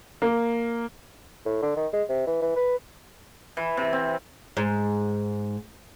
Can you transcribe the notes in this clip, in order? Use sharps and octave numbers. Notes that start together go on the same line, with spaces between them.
A#3
A2
D3
D#3
G#3
C3
E3
E3
B4
E3
C3
C4
G#2